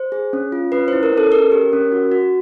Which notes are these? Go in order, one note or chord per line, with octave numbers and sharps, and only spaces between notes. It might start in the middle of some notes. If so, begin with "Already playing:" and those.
Already playing: C5
G#4
C#4
F4
C#4 B4
E4 C5
A#4
C#4 A4
C#4 A#4
G4
C#4
F#4
F#4